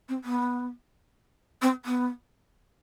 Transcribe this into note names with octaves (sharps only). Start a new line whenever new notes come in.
C4
B3
C4
B3